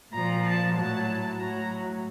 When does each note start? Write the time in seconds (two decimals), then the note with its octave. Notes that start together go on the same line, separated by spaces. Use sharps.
0.13 A#2 F3 A#5
0.44 A5
0.75 A2 F#3 A5
1.38 A2 F#3 A#5